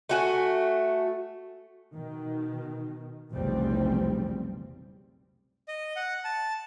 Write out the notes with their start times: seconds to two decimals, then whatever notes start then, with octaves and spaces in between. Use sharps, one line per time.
0.09 A3 F#4 G#5
1.94 B2 D#3
3.31 F1 B1 E2 C#3 G3 C4
5.68 D#5
5.96 F#5
6.25 A5